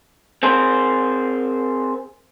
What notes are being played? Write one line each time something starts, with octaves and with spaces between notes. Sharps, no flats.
C4 G#4 A#4 C5